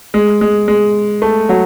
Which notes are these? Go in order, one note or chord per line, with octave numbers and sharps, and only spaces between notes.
G#3
G#3
G#3
A3
F#3